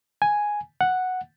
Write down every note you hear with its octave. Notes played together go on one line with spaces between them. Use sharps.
G#5
F#5